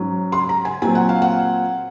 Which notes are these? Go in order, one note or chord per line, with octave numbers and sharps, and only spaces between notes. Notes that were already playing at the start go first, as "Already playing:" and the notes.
Already playing: G#2 F#3 C#4
C6
A#5
G#5
A#2 F#3 C4 G#5
F#5
F5
F#5